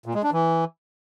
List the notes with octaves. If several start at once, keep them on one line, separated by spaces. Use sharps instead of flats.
A#2
G#3
D4
E3